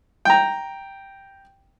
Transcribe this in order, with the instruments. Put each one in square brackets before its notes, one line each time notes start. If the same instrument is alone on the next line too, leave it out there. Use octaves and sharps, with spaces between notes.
[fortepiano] G5 A#5